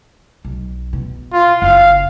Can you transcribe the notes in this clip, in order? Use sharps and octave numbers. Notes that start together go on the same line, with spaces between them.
B1
B2
F4
F#1 F5